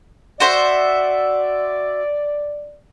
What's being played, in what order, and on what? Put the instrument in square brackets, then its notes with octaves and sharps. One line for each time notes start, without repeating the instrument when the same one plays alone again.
[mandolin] F#4 C5 E5 [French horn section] D5